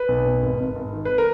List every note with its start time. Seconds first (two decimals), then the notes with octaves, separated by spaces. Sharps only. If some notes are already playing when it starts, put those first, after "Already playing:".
Already playing: B4
0.08 B1
0.26 B2
0.42 G#1
0.59 G#1
0.75 G#1
0.93 D#3
1.05 B4
1.18 A#4